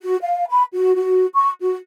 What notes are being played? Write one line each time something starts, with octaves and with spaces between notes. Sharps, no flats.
F#4
F5
B5
F#4
F#4
C#6
F#4